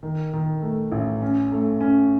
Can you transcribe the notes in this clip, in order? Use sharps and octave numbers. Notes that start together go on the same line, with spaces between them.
D#3
D#3
A3
A1
C#4
A3
C#4